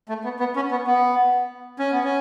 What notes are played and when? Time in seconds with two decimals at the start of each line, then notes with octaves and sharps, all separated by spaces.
0.09 A3
0.24 B3
0.39 B3
0.56 C#4
0.71 B3
0.87 B3
1.79 C#4
1.92 B3
2.04 C#4